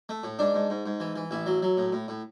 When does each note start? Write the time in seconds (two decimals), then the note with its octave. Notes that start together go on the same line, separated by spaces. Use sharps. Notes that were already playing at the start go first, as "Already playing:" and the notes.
0.09 A3
0.24 A2
0.39 G#2 D4
0.54 G#2
0.70 G#2
0.86 G#2
1.00 E3
1.16 E3
1.31 A1 E4
1.46 F#3
1.62 F#3
1.77 A2
1.92 A2
2.08 A2